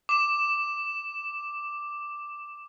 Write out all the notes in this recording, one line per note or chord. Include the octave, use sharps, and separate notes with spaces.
D6 E7